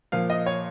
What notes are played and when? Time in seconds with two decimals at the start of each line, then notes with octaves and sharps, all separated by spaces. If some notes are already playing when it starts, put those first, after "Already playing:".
0.12 A#2 F3 A#3 F5
0.30 D#5
0.46 C#5